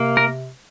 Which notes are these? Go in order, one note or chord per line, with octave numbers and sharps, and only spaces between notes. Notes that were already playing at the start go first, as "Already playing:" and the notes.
Already playing: C3 A#3
A#4